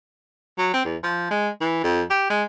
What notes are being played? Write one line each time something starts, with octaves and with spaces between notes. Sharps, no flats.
F#3
C4
E2
F3
G#3
E3
F2
G4
G#3